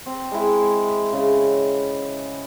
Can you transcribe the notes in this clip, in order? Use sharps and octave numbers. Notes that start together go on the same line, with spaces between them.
C4
G#3 E4
C#3